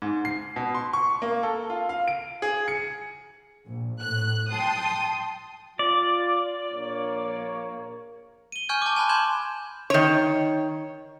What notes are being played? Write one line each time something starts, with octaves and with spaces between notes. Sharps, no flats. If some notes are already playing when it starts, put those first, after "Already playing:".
G#2
C7
B2
C6
C#6
A#3
A4
F4
F5
D7
G#4
C#7
A#1
A2 F#6
G5 A5 C6 D#6
F4 D5
A#1 A#3 C#5
D#7 G7
G#5 C#6 F6 G6 G#6
A5 D6
G#5 A5 B5 F#6
C6 G6 G#6 E7 F#7
D#3 C#5